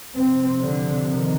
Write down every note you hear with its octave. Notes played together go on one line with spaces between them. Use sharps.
F2 C3 C4
D3
D#3